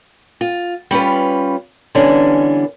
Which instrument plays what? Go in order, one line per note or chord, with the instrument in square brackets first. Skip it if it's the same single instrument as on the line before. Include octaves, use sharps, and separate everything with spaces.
[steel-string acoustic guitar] F4
G3 C#4 F4 B4
D3 E3 G3 B3 C#4 D4